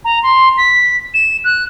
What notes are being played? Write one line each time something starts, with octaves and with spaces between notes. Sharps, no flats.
A#5
C6
B6
E7
F#6